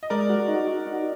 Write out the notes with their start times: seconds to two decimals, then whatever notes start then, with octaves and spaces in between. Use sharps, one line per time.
0.03 D#5
0.10 G#3 A#4 D5
0.29 F#4
0.48 D#4
0.68 F#4
0.87 D#4